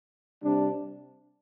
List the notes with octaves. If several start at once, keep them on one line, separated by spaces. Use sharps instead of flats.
C3 G3 D4